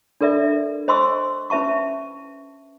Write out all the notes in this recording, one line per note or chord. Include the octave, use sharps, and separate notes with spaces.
D4 A4 A#4 D5 E5
C5 D#5 G#5 C6 C#6 E6
C#4 B4 E5 A5 C#6